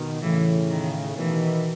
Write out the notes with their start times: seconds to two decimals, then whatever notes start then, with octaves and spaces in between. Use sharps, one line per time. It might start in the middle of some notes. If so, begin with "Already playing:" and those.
Already playing: B2 D#3
0.22 A2 C#3 E3
0.70 D#3
1.17 B2 D#3 E3